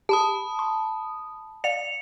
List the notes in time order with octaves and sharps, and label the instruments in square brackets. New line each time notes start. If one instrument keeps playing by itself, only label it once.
[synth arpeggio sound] G4 [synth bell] A5 B5 D#6
[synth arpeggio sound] C6
[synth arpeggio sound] D5 F5 [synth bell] C#7 F7